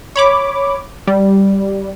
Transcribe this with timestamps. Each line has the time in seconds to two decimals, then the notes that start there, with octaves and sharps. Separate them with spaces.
0.16 C#5 B5 D6
1.07 G3